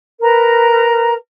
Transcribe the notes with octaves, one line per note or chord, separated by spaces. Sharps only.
A#4 B4 A#5